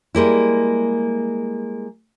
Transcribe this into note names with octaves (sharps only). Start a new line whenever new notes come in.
G3 G#3 A#3 E4